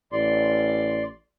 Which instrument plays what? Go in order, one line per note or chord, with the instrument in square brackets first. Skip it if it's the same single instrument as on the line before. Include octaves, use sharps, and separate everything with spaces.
[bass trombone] A1 [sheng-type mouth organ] D5 C6